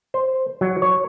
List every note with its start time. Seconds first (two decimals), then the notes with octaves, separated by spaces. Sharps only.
0.14 C5
0.61 F#3
0.82 C#5